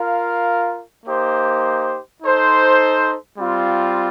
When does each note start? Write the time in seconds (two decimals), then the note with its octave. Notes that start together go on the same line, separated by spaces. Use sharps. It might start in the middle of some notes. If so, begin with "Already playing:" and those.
Already playing: F4 A#4 F5
1.06 A#3 D#4 G4 C5
2.23 D#4 A4 C5
3.37 G3 C4 F4